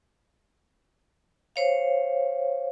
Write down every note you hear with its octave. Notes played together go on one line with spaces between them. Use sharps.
C5 C#5 F5